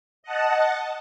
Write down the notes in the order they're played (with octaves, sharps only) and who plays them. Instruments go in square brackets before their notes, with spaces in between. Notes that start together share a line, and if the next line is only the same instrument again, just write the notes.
[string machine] D#5 F#5 A5